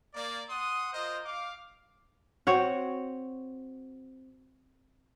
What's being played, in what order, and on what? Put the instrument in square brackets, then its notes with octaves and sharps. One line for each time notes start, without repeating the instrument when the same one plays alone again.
[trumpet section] A#3 D5
F#5 C6 D#6
F4 A#4 C5 D#5
F5 D6
[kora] C4 F#4 C#5 F#5